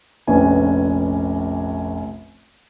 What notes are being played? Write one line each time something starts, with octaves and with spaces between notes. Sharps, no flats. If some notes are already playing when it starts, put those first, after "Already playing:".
F1 A#1 B3 C#4 G#5